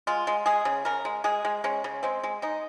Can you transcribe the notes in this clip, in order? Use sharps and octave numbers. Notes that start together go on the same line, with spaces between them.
G#3 F4
G#3
G#3 G#4
C#3
C#3 A#4
G#3
G#3 G#4
G#3
G#3 C#4
C#3
G#3 C4
G#3
G#3 D#4